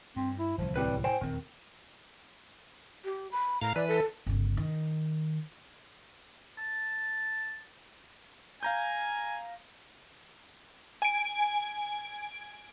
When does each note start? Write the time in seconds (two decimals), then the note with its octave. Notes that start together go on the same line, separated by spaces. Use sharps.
0.16 G2 C4
0.39 E4
0.58 D1 C2 E3 F3
0.76 A2 G3 C4 B4
1.04 C5 G5 G#5
1.21 D#1 E2 D#3 C4
3.05 G4
3.31 B5
3.62 A2 F5 A#5
3.76 E3 B4 D5
3.88 A4
4.26 G1 C#3
4.57 D#3
6.58 A5
8.63 F5 G#5 A#5 G6
11.02 G#5 D7